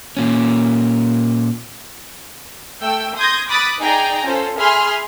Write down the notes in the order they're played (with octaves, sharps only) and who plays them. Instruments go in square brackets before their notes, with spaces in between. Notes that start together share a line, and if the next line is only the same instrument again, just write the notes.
[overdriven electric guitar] A#2 C#4
[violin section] A3 G5 E6
C6 D#6 G6 G#6 A#6
B5 D6 D#6 F#6 A6
D#4 G#4 D5 G5 G#5 A#5
C#4 F4 A4 C5
G#4 E5 G#5 B5 C6 F6